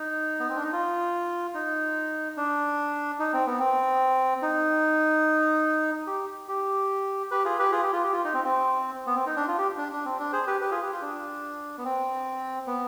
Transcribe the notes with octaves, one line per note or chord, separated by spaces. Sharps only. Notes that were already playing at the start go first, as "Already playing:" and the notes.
Already playing: D#4
B3
C4
D4
D#4
F4
D#4
D4
D#4
C4
B3
C4
D#4
G4
G4
G4 B4
F4 G#4
G4 B4
F4 G#4
G4
F4
G4
F4
D#4
C4
C4
B3
C4
D#4
D4
F4
G4
D4
D4
C4
D4
G#4 C5
G4 B4
G4 B4
F4 G#4
G4
F4
D4
B3
C4
B3